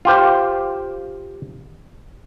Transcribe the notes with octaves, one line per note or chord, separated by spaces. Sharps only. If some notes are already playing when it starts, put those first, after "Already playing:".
F4 G4 C5